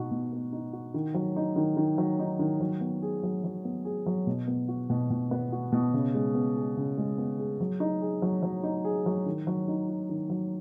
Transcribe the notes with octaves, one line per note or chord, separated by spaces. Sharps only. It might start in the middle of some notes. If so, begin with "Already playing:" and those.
Already playing: B2 D#4 F#4
B2
B3
D#4
F#4
D#3
F#3
D#4
D#3
D#3
F#3
D#4
D#3
F#3
B3
G#4
F#3
F#3
B3
G#4
F#3
B2
B3
F#4
B2
B2
B3
F#4
B2
C#3
G#3
B3
G#4
C#3
G#3
B3
G#4
F#3
D#4
G#4
F#3
F#3
D#4
G#4
F#3
D#3
F#3
D#4
F#4
D#3
F#3